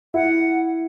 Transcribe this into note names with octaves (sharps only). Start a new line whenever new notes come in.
E4 F#5